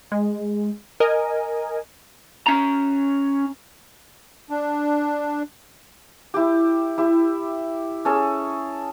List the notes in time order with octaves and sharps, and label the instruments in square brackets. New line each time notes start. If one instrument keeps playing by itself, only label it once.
[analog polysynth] G#3
A#4 D#5 G#5
[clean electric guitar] C#4 A#5
[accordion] D4
[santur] E4 G4
E4 G4
C#4 G#4 A4